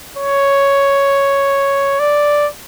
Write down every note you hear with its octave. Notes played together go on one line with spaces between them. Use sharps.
C#5
D5